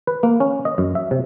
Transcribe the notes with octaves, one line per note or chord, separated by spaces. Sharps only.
B4
A#3
C#4
D#5
F#2
E5
C3